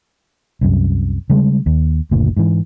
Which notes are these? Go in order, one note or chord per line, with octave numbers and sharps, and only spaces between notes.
C2 F#2
C#3 G3 G#3
D#2
F#1 D2 A#2
G#2 E3